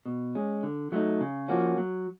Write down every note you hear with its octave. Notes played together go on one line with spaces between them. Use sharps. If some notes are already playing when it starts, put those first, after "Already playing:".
B2
G#3 C#4
D3
F#3 A3 C4 D#4
C#3
F3 A#3 C#4 F#4
F#3